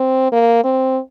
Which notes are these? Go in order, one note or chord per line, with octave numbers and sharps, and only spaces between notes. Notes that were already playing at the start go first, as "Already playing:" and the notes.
Already playing: C4
A#3
C4